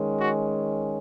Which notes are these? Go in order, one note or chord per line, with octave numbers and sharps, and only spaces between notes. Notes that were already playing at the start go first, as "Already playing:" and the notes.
Already playing: D#3 G#3 C#4
F#4